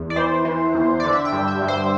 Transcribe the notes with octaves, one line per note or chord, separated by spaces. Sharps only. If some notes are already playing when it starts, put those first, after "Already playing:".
Already playing: E2
D5
E3 C5
E3
E2
D3 D5
E5
G5
G2
E5
G2
C5